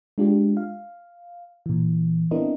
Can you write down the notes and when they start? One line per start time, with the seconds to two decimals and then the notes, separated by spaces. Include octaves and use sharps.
0.18 G#3 D4 F4 G4
0.57 F5
1.66 A#2 E3
2.31 B3 C4 D4 E4 A#4 D#5